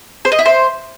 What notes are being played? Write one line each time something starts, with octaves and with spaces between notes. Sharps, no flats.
C5
D#5
E4
C5